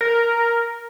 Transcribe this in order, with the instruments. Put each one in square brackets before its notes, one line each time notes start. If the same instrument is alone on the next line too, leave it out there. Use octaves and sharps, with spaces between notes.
[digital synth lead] A#4